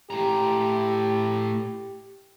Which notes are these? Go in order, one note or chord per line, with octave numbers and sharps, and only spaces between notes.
A2 G4 A#5